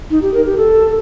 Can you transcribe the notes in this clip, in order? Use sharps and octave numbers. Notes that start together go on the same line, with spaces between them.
D#4
G4
A#4
G4
A4